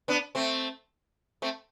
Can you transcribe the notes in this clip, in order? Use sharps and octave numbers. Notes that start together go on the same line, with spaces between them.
B3 D4
A3 C4
A3 C4